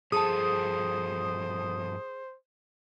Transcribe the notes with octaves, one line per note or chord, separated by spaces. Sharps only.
G2 F3 G#4 A4 C5 A5 D#6